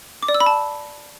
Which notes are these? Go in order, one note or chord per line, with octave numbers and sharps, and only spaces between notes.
D6
D5
E6
B5
A5